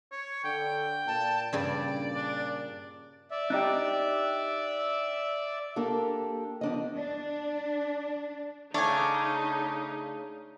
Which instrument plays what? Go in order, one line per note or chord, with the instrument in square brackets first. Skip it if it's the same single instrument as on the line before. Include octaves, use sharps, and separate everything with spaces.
[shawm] C#5
[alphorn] D3 [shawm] G5
[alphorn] A#2 [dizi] A5
[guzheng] G2 C#3 G3 [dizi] D5
[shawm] D4
[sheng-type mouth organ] D5 E5
[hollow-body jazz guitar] D4 D#4 G4
[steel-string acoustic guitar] A#3 D4 G4 A4
E2 D4 D#5
[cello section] D4
[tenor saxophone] C#3 [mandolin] A3 C#5 G#5 [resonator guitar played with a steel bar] D4 [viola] D#4